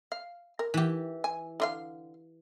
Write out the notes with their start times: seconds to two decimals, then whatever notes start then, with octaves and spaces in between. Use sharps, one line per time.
0.12 F5
0.59 A#4
0.74 E3 G4
1.24 G#5
1.60 D3 F4 F5